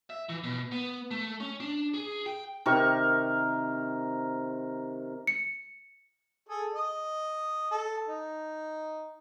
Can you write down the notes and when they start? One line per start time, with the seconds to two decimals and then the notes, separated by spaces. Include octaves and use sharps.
0.10 E5
0.29 E3
0.44 B2
0.72 B3
1.11 A3
1.40 C#4
1.60 D4
1.94 G#4
2.26 G5
2.66 C3 D#3 A#4 C#6
5.27 C#7
6.49 G#4 A4
6.74 D#5
7.71 A4
8.08 D#4